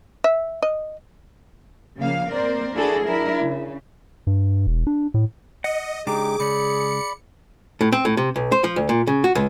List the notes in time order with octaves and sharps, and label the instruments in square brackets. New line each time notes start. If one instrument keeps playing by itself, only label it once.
[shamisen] E5
D#5
[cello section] C#3 F3 A#3 F5
A#3 C4 A#4 C5 D5
D4 E4 F#4 G#4 A4
F#3 D4 E4 A#4
C#3
[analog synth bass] G2
E1
D4
A2
[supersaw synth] D#5 [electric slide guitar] F#5
[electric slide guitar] C#3 G#3 D4 [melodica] D#4 G4 [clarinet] G#4 [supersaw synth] D6
[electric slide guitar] C#3 G#3 [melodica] D5 B5 [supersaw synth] C#7
[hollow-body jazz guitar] A2
C4
A2
C3
B1
C5
F3
D2
A#2
C#3
F#4
C#2